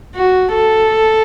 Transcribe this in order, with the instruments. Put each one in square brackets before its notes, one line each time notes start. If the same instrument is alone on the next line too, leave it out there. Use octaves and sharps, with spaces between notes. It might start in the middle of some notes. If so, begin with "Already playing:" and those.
[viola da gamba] F#4
A4